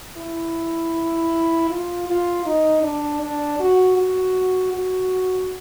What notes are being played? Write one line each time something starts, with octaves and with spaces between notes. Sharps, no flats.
E4
F4
F4
D#4
D4
D4
F#4
F#4
F#4